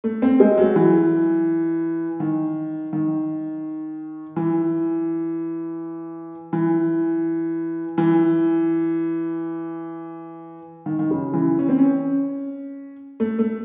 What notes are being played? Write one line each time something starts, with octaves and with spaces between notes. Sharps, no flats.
A3
C4
G#3
F#3
E3
D#3
D#3
E3
E3
E3
D#3
D#3
C#3
E3
C#4
C4
C#4
A3
A3